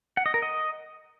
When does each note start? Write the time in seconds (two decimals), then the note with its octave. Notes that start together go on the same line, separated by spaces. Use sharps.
0.17 F#5
0.26 D#5
0.34 A#4
0.42 D#5